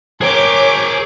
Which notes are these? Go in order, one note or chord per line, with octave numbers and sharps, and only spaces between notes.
G#4 A#4 C5 C#5 G5 A#5 D6